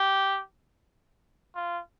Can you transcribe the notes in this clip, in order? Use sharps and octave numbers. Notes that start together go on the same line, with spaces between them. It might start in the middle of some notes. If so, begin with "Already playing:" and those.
Already playing: G4
F4